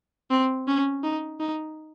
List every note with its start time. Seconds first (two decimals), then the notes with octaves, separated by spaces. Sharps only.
0.31 C4
0.68 C#4
1.04 D#4
1.40 D#4